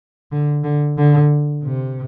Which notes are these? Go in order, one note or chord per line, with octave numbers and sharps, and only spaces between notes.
D3
D3
D3
C3